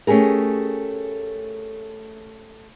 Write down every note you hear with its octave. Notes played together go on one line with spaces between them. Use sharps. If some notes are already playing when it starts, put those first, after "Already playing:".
A3 C#4 G4 G#4 A#4